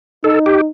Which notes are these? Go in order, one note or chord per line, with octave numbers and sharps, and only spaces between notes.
D#4 A4
G4